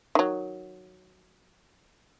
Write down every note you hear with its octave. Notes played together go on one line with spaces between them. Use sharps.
D#3 F#3